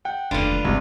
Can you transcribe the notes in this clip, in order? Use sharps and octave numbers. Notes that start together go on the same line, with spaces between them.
F#5 G5
F1 D#2 D3 D4 F4 B4 F5
G1 C2